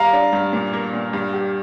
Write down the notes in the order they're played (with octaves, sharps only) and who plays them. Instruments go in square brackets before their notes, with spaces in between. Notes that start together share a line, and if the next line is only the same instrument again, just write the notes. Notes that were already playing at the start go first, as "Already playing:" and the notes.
Already playing: [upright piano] G3 [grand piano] F5 A#5
[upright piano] D4
G2
A#2
A#3
A#2
G2
G4